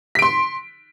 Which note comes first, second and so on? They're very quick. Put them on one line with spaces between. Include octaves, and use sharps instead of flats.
B6 D7 C6